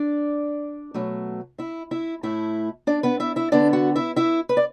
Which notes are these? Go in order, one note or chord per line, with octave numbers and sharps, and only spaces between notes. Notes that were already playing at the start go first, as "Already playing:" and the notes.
Already playing: D4 D5
B2 F#3 A3
E4 E5
E4 E5
A2 A3 E4 E5
D4 D5
B3 B4
E4 E5
E4 E5
D3 B3 D4 D5
F#4 F#5
E4 E5
E4 E5
B4
D5